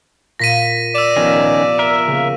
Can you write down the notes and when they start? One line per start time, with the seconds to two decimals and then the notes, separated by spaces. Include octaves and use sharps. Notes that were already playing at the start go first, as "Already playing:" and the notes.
0.39 A#2 A#6 B6 D#7
0.95 D5 E6 E7
1.17 F1 D#3 B3 C#4 F4
1.79 A#4 E5
2.07 C#3 A#3